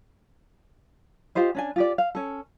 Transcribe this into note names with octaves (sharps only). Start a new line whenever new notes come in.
F4 G4 C5 D#5
C#4 D4 G#5
F4 G4 D5
F5
C#4 A4